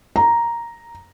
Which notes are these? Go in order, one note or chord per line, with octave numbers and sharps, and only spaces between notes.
A#5